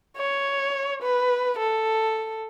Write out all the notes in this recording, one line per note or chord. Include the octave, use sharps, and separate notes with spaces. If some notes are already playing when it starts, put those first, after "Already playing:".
C#5
B4
A4